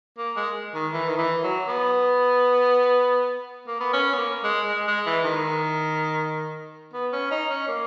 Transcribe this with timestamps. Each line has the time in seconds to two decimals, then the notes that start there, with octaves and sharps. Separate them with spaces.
0.18 A#3
0.36 G#3
0.75 D#3
0.93 E3
1.09 D#3
1.18 E3
1.43 F#3
1.68 B3
3.67 A#3
3.80 B3
3.93 C#4
4.14 B3
4.18 A#3
4.43 G#3
4.68 G#3
4.87 G#3
5.06 E3
5.24 D#3
6.93 B3
7.13 C#4
7.31 D#4
7.50 C#4
7.68 A#3